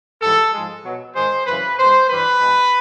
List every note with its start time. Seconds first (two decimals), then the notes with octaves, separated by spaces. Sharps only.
0.22 G#2 E3 G3 A4
0.54 G#2 F3 G#3
0.85 B2 F#3
1.16 G#2 D#3 G#3 C5
1.47 F#2 C#3 E3 B4
1.79 B2 G#3 C5
2.10 G2 E3 G3 B4
2.41 B2 G#3